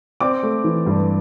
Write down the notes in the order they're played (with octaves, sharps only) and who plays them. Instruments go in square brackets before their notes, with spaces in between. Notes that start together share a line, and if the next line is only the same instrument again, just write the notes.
[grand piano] C4 D5 D6
A3
E3
G2